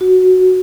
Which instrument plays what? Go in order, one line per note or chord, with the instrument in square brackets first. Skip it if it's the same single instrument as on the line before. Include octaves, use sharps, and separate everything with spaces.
[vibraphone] F#4